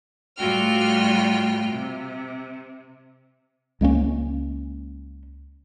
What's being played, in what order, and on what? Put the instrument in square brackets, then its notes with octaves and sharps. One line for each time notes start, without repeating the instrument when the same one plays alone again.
[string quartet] A2 G3 F4 F#4 G5 F6
C3
[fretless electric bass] C#2 G#3 A#3 C#4